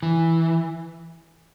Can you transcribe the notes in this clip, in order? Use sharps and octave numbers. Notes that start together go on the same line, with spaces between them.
E3